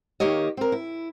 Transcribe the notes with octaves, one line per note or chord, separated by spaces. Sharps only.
D#3 A#3 G4 C#5 D#5
C4 A#4
E4